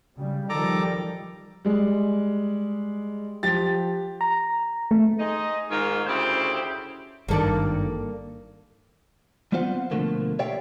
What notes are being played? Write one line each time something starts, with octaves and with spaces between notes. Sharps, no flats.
C#3 G3
D#3 F3 G3 A4 A#5 D6
G3 G#3
F3 G4 A6
A#5
A3
D#4 G#4 C5 D#5
G#2 D#3 A#3 F4 A#4 C#5
D2 C#3 E4 G4 C5
G#1 G2 D#3 A#3 A4 D5
G3 B3 C4 F4 C5 F#5
B2 D3 F3 A3 A#3
G4 C#5 D5 E5 F5 G5